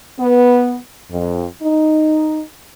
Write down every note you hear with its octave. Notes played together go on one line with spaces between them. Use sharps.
B3
F2
D#4